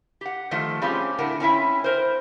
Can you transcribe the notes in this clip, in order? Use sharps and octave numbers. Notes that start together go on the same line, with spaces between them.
G4 F#5
D#3 F3 A3
G3 C4 C#4 F4 G4 G#4
A2 D3 E4 A#4 F#5 A5
C4 C#4 E4 E5
A#4 C5